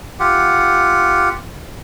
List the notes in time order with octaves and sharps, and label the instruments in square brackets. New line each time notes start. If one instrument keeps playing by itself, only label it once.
[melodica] F4 G4 F#5